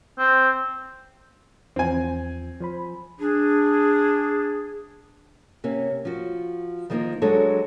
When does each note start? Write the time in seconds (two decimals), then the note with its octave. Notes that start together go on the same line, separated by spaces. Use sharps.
0.19 C4
1.76 E2 F3 C4 G#5
2.60 F3 C5 B5
3.20 D4 G#4
5.64 C3 A#3 C#4
6.05 F3 F#4
6.90 D#3 F3 G3 A3 A#3 D#4
7.22 F#3 G#3 D4 A4 C#5